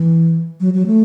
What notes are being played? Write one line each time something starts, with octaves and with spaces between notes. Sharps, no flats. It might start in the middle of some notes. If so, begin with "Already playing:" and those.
Already playing: E3
F#3
F#3
A3